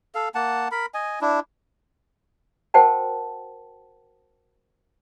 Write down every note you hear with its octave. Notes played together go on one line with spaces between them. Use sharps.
A4 F5
A#3 F#5 A5
A#4 B5
D#5 G#5
D4 E4
F#4 A#4 C5 F#5 G5 A5